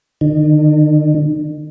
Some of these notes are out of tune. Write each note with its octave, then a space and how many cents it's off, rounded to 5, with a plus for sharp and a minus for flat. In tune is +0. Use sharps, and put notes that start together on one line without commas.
D#3 -45